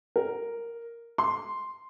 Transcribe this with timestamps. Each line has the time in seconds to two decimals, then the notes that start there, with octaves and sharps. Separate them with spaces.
0.16 A#4
1.18 C6